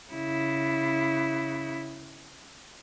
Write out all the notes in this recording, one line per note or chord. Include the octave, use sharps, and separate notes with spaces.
C#3 E4